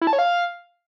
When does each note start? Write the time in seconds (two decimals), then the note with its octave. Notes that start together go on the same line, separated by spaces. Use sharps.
0.01 E4
0.07 A5
0.13 C#5
0.19 F5